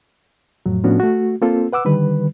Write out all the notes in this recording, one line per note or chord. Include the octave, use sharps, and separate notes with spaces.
F2 A2 F#3
A2 F3 B3 C#4 D4 F#4
A3 F#4
A#3 C4 F4 A4
B4 F#5 D6 E6
D3 D#3 G3 B4